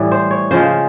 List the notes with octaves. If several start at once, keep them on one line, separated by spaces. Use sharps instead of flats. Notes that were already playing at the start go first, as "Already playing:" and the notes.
Already playing: A2 E3 G3
C5
C#5
C#3 F3 G#3 C5